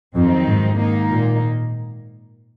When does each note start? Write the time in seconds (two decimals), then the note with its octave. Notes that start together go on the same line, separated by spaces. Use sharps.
0.14 F2 D#3 F#3 C4 D#4
0.47 G#2
0.77 G#2 D#3 A#3 D#4
1.11 A#2